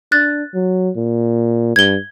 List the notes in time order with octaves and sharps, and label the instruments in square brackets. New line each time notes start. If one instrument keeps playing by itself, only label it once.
[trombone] D4 [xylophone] F#6 A6
[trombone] F#3
A#2
[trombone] G2 [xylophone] G#6 G7